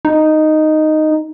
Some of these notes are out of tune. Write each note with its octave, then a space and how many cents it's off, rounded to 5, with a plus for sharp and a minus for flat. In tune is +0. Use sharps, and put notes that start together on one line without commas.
D#4 -5